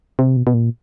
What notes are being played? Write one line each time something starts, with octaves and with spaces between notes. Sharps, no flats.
C3
B2
B2
A#2